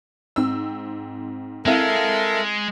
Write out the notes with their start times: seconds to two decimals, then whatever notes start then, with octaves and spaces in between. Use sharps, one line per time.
0.36 G#2 C4 E6
1.66 G#3 C4 E4 A4 A#4 E5 F5